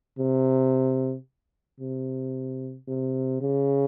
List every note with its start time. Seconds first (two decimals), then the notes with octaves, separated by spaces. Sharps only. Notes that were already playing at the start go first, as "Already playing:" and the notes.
0.19 C3
1.80 C3
2.88 C3
3.41 C#3